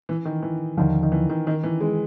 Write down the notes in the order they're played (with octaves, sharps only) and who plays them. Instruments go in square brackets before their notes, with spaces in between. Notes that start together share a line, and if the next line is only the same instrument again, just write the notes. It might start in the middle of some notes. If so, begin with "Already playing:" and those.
[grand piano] E3
D#3
E3
[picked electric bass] D#2 D3 F3 [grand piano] D#3
[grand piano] D#3
E3
D#3
D#3
E3
G#3